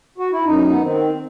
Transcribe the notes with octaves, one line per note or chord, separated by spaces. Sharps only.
F#4
E4
F#2 D#4
B3
D#3 C4